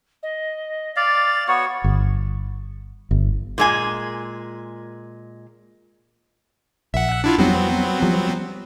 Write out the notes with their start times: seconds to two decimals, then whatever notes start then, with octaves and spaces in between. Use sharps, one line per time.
0.23 D#5
0.96 D5 F5 A6
1.48 B3 F#4 C#5 C#6
1.84 G1
3.11 G1
3.58 A#2 G#3 G#5
6.94 A#1 E5 F#5
7.24 D4 E4 F4
7.38 F2 F#3 G3 B3 C4
8.02 F3 G3